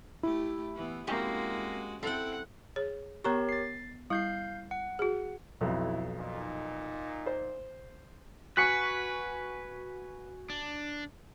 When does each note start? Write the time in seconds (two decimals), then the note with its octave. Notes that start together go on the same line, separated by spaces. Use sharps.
0.23 A3 E4 G4
0.75 E3 B3
1.07 G#3 A#3 C4 C#4 F#4 G4
2.03 C4 E4 A4 F#5 G5
2.76 G#4 C#5
3.24 B3 G4 A#4 C#5 A#5 C#6
3.49 A6 C7
4.10 G3 E4 F5 G6 C7
4.71 F#5
4.99 F#4 G#4
5.61 B1 F2 E4
6.18 A#2 D#4
7.26 C5
8.57 F#4 B4 G#5 C#6 F#6 B6 C#7
10.50 D4